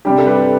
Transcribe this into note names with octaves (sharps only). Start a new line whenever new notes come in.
C3 G3 D4 G4
A4
G4 B4